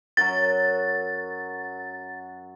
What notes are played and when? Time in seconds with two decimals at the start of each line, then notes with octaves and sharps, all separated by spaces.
0.17 F#2 F#3 A6